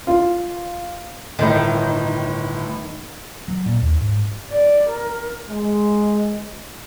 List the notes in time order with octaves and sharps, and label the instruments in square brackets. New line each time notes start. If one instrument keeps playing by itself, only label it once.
[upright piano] F4
[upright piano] G1 A2 [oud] D#3
[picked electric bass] F#3
A#2
D#2
G#2
[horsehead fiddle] D5
A#4
[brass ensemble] G#3